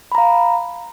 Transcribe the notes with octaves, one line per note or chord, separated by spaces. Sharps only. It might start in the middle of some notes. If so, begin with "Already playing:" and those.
F5 A#5 B5